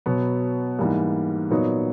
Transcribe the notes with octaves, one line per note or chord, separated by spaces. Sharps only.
B2 F#3 B3
G#2 E3 G3 A#3
A#2 F#3 B3 D#4